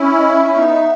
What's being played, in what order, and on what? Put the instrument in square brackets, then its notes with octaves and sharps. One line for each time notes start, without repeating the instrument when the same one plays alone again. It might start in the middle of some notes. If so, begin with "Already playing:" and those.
Already playing: [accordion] C#4 E4
[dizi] D#5
E5
[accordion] E4
B3 D#4